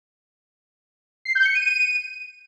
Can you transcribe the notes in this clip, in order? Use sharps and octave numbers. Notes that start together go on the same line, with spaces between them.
C7
G6
C#7
D#7